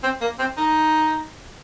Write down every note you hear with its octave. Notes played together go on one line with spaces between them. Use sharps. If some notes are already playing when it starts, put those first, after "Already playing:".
C4
A#3
C4
D#4